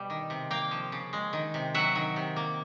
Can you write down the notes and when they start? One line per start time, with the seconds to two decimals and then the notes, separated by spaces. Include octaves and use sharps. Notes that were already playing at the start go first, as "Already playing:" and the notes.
Already playing: B2 G3
0.10 D#3
0.30 C3
0.51 A#3 F5 G5
0.71 F3
0.92 C#3
1.13 G#3
1.33 D#3
1.54 C3
1.74 F#3 E5 F#5
1.95 D#3
2.16 C3
2.36 A#3